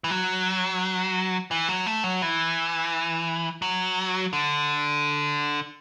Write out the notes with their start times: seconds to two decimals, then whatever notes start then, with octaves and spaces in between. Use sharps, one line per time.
0.04 E3
0.10 F#3
1.51 E3
1.68 F#3
1.86 A3
2.04 F#3
2.22 E3
3.62 F#3
4.33 D3